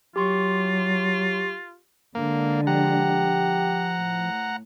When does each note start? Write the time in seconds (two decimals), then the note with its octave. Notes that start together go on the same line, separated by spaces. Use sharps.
0.16 F#3 F4 G4 C6 C#6
2.15 D3 G#3 A#3
2.67 F3 G4 F#5 A#5
3.97 A2